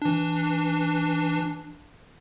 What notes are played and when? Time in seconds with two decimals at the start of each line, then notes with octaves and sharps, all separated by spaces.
0.02 E3 D4